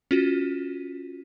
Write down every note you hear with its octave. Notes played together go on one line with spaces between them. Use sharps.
C#4 F4 F#4